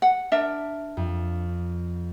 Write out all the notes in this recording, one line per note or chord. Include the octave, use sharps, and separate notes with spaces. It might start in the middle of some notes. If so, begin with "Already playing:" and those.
F#5
D4 A#4 E5
F2